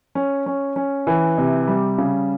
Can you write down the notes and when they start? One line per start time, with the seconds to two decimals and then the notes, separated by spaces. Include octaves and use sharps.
0.15 C#4
0.46 C#4
0.76 C#4
1.07 E3
1.38 C3
1.67 G3
1.98 C#3